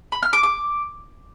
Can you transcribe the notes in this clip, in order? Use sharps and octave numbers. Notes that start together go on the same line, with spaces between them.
B5
F6
D6
D6